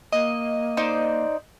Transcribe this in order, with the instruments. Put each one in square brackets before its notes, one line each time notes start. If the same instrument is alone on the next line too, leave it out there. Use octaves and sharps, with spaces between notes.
[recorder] A#3 [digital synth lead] D#5
[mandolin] D#4 C5 D5